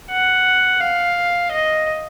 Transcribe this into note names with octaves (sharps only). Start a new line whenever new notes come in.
F#5
F5
D#5